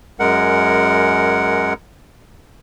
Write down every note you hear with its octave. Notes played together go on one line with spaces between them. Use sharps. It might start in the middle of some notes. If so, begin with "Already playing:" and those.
F#2 G#3 A#4 F#5